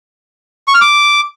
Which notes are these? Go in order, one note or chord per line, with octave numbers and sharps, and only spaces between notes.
C#6
F6
D6